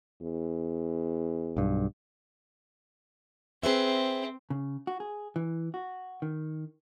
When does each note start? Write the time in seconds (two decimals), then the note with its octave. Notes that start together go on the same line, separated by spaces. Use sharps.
0.22 E2
1.57 B1 G2
3.63 C4 G#4 B4 E5
4.50 C#3
4.87 F#4
5.00 G#4
5.36 E3
5.74 F#4
6.22 D#3